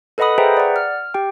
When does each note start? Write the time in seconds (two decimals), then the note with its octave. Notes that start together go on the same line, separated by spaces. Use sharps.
0.18 A4 B4 D#5 F#5 B5 D#6
0.38 G#4 B4 C5 E5 G5 A#5
0.57 D5 F#5
0.76 F6
1.14 G4 G5